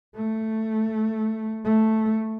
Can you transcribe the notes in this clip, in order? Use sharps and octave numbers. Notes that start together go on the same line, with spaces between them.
A3
A3